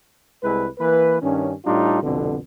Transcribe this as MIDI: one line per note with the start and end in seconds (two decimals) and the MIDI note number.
0.43 0.67 36
0.43 0.67 56
0.43 0.67 64
0.43 0.67 71
0.79 1.20 52
0.79 1.20 58
0.79 1.20 71
1.22 1.52 43
1.22 1.52 51
1.22 1.52 61
1.65 2.02 45
1.65 2.02 55
1.65 2.02 62
1.65 2.02 63
1.65 2.02 65
2.03 2.37 36
2.03 2.37 41
2.03 2.37 47
2.03 2.37 50